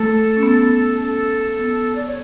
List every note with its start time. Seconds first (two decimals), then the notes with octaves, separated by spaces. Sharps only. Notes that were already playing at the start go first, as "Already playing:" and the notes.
Already playing: A3 A4
0.37 C#4
0.43 B3
1.01 C#4 A4
1.60 B3
1.96 D5
2.06 C#5